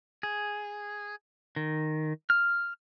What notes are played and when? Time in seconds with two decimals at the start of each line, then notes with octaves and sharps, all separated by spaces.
0.23 G#4
1.56 D#3
2.30 F6